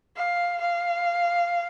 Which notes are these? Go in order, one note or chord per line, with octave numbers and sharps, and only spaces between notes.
F5
F5